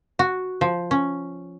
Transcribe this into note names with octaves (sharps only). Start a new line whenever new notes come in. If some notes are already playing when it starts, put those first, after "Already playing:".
F#4
F3
C#4